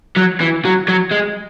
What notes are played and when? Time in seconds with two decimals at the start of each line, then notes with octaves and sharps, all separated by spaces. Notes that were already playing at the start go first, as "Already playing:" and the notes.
0.17 F#3
0.41 E3
0.65 F#3
0.88 F#3
1.12 G#3